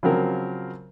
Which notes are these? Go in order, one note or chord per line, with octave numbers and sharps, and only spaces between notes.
C#3 F3 F#3 C4 A#4